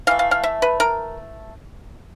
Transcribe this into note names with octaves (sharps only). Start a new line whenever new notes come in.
E3 A3 F5
F5
F5
E5
B4
A#4